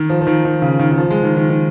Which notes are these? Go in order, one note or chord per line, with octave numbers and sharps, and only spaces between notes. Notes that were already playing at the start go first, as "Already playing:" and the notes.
Already playing: D#3
F3
F3
D#3
D#3
C#3
D#3
D#3
F3
G#3
D#3
D#3
D#3